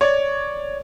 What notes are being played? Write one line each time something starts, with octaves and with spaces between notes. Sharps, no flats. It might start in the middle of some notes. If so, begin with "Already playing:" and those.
C#5 D5